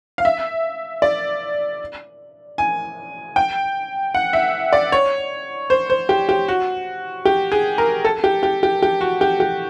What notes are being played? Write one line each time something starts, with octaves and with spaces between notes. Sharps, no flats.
F5
E5
D5
G#5
G5
F#5
E5
D5
C#5
C5
C5
G4
G4
F#4
G4
G#4
A#4
A4
G4
G4
G4
G4
F#4
G4
G4